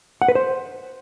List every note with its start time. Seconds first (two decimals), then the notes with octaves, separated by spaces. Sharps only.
0.22 F#5
0.28 B4
0.35 C5